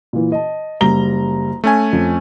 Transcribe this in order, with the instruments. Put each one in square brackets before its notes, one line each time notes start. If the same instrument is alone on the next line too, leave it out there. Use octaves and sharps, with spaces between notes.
[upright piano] A#2 E3
D#5 A5
[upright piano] F#1 G3 G7 [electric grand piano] A#5
[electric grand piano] A3 C#4 G#5
[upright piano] F2